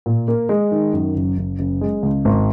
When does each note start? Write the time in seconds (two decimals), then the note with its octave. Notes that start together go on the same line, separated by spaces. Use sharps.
0.06 A#2
0.28 A#3
0.49 G#3
0.71 D#3
0.93 F#2
1.15 F#1
1.37 F#1
1.59 F#1
1.81 G#3
2.03 C#2
2.25 G#1